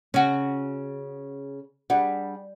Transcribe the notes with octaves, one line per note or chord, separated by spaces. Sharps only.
C#3 C#4 F#4
G3 D4 G#4 F#5